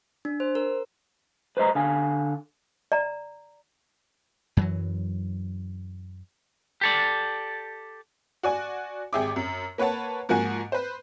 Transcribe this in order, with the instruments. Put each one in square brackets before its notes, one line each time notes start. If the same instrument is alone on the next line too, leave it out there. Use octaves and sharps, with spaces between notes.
[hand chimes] D4
C5
A#4
[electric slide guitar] B4 C5 D#5 A#5
D3 F5 G#5
[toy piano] D5 A#5
[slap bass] F#2 E3 F#3
[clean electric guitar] G4 A4 D5
[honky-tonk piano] F#4 D5 G#5
G#1 G4 G#4 E5 D6
F#2
A#3 B4 C#5 F#5 A5
G#2 F3 A#3 F#4 F#5 G#5
B4 C5